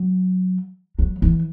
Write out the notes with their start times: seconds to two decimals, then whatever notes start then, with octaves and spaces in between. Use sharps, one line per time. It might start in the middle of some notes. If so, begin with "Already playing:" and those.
Already playing: F#3
0.99 F#3
1.22 E3